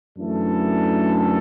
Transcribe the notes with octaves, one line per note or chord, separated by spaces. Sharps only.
F#2 E3 A3 D4 A4